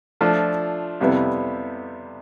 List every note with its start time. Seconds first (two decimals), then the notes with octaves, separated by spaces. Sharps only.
0.21 F3 A3 D4 F4
1.00 F2 C3 G3 B3 E4